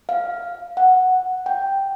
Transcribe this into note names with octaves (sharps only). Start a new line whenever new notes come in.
F5
F#5
G5